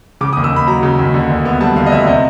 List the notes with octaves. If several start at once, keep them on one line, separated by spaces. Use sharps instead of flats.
C#3 D6
D#2 D#6
E6
D#2 B5
F#3 A#5
C#3
D#2
D3
D2
B3
G3 A5
D3 F5
D#5
D2 E5
C3 D#5